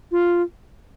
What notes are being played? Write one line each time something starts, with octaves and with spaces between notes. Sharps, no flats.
F4